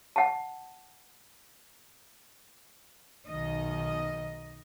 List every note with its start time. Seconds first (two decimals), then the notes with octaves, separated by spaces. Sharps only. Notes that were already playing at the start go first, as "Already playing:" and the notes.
0.16 F#5 A5
3.29 B1 D#3 D#5